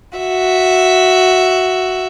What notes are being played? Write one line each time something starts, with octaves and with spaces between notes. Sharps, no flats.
F#4 E5